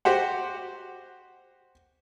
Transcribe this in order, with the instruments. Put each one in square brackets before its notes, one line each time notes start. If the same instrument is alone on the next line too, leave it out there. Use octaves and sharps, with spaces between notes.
[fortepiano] F#4 G4 C5 F#5